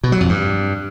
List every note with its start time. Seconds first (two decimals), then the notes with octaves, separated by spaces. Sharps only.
0.04 B2
0.12 F#3
0.21 F2
0.29 G2